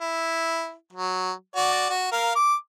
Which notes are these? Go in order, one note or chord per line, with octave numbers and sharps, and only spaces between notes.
E4
F#3
F#4 D5
F#4
A#4 F5
D6